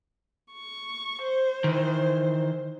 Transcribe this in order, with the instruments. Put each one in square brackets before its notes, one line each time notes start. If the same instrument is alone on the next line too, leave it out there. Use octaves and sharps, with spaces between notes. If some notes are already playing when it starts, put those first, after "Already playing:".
[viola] C#6
C5
[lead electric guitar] D#3 E3